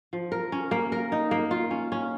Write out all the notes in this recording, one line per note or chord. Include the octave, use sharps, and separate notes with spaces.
F3
A#4
C#4
A#3
A#4
D#4
A#3
F4
C#4
C#4